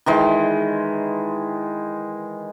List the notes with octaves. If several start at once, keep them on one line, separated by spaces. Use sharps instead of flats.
D#3 E3 G#3